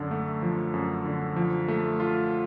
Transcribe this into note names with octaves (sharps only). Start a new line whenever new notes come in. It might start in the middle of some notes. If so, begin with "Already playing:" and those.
Already playing: F#2 D3
A3
F3
F#2
D3
F3
A3
F4